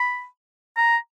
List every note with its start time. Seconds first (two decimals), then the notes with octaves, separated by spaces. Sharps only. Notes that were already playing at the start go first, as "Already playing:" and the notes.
Already playing: B5
0.77 A#5